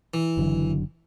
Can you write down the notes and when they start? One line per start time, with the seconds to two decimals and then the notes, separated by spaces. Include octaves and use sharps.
0.14 E3
0.37 F#1 D3 F#3